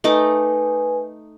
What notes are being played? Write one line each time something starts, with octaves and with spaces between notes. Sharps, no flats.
A3 D#4 B4 G#5 D6